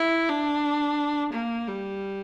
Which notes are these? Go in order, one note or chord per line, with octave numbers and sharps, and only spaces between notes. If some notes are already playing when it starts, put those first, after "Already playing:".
Already playing: E4
D4
A#3
G3